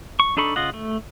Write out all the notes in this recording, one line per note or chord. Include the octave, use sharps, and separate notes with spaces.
C#6
D4 D#4 A4 B5 C#6
C#3 F4 D#5 F#5
A3